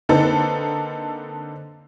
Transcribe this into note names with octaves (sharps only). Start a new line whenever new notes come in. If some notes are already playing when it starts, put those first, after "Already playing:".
D3 A#3 C4 D#4 A4 B4